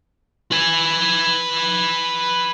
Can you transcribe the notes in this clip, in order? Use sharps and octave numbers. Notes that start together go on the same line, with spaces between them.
B4 G#5